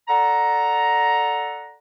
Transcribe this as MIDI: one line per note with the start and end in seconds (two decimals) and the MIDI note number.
0.08 1.76 69
0.08 1.76 74
0.08 1.76 78
0.08 1.76 82